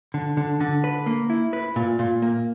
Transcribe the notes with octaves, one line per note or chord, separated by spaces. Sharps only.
D3
D3
D3
B4
A#3
E4
B4
A#2
A#2
A#3